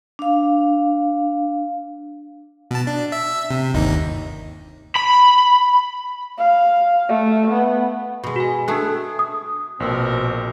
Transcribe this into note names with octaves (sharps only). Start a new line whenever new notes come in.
D4 F5
B2 A5
D4
E5
C3
G1 D#2 D#4
B5
F5
A3
B3
B2 G#3
F#4 G#5
A3 D4 G#4 A5 F#6
D#6
A#1 B2 C4 A#4